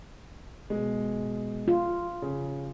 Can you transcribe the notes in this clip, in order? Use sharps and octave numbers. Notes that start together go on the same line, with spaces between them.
B2 G#3
F4
C#3